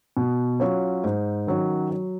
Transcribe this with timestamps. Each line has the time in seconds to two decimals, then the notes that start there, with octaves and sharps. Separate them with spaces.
0.17 B2
0.60 F#3 C#4 F4
1.04 G#2
1.47 D#3 F#3 C#4
1.90 F#3